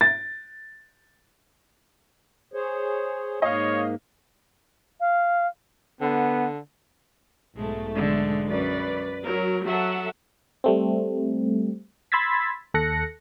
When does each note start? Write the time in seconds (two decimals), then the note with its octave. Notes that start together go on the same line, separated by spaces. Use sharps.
0.01 A6
2.54 G#4 C5 C#5
3.42 G#2 A#3 C#5 D#5 F5
5.00 F5
6.01 D3 B3
7.56 B1 G#2 G#3 A3
7.95 D3 G#3
8.49 F#2 B4 D5
9.24 F#3 A#4
9.65 F#3 A4 E5 F#5
10.64 G3 A3 C4
12.12 B5 C6 E6 G#6 A6 B6
12.74 D#2 A4 F#6 A#6 C#7